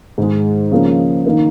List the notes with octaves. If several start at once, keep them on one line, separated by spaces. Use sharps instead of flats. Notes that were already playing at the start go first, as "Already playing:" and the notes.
G#2 D#3 G#3
C#3 F3 A#3 C#4
D#3 A#3 D#4 A#4